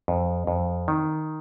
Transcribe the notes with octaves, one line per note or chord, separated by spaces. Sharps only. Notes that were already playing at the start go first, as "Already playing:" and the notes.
F2
F2
D#3